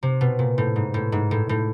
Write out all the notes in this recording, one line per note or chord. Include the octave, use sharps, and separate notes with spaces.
C3
B2
A#2
A2
G#2
A2
G#2
A2
A2